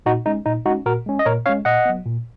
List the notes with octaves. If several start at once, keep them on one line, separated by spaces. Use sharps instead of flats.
A#2 D#4 F#4
G#3 C#4 D#4
A#2 D#4
G#3 C#4 D#4 F#4
A#2 F#4 A#4
G#3 C#4
D#5
A#2 A#4 C#5
G#3 C#4 C#5 F5
A#2 D#5 F#5
F#3 B3
A#2